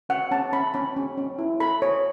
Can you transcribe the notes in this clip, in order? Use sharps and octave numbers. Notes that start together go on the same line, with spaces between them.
C#4 F#5
C#4 A5
C#4 B5
C#4 B5
C#4
C#4
E4
A4 B5
C#5